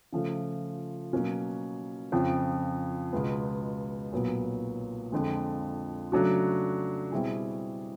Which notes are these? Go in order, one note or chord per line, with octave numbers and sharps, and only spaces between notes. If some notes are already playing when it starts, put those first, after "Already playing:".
C#3 F3 A3
B2 F#3 A#3 C#4 F#4
F2 C#3 F3
C#2 B2 G#3 B3
B1 A#2 F#3 B3
F2 D3 F3 G#3
C#3 F#3 A3 D4 F#4
B2 G3 C4 E4 G#4